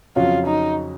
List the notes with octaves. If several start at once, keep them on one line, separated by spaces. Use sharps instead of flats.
F2 C#3 F#3 C#4 F4 F#4
D#4